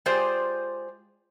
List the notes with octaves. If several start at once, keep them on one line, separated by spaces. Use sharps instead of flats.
G#3 F4 G4 G#4 C5 D5